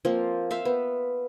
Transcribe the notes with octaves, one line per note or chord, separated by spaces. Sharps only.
F3 A#3 C4
C5 E5 F5
B3